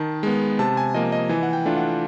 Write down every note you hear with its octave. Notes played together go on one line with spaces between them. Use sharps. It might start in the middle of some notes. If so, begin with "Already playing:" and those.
Already playing: D#3 A5
G#3 B3
C3 A5
G#5
F3 A#3 D#5
D#5
E3 G#5
F#5
G5
A3 D4 F4
F#5